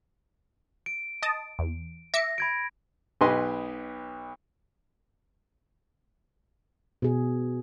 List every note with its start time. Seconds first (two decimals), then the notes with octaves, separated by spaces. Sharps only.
0.86 D7
1.22 D#5 A5 D#6
1.59 E2
2.14 E5 D6 A#6 C#7
2.38 B5 G#6 D7
3.21 B1 G4 B4 D#5 G#5 C6
7.02 B2 G#4